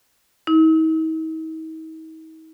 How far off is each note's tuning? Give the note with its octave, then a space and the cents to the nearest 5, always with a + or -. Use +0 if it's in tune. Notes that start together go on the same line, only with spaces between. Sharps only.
D#4 +45